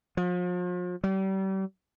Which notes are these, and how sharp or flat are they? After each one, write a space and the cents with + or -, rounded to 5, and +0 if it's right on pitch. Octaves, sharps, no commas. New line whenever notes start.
F3 +40
G3 -35